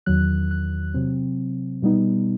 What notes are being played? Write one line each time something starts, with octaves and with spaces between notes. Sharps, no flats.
E2 D#3 F#3 F#6
F#6
C3 F#3 C4
B2 G3 B3 D#4